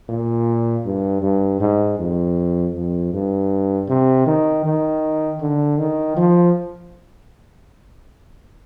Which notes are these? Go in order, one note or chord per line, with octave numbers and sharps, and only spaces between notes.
A#2
G2
G2
G#2
F2
F2
G2
C3
D#3
D#3
D3
D#3
F3